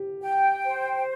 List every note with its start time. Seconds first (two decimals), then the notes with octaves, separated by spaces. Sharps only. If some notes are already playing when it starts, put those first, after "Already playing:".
Already playing: G4
0.21 G5
0.63 C5